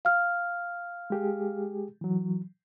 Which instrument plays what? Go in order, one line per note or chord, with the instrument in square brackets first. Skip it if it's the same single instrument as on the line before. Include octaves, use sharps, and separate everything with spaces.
[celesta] F5 F6
[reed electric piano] G#3 G4 G#4
E3 F#3